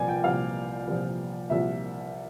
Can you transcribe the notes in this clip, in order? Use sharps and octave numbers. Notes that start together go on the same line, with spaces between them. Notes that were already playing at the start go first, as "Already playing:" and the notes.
Already playing: C2 A#2 F3 D5 G#5
G5
C2 A#2 F3 F5
C2 A#2 F3
C2 A#2 F3 E5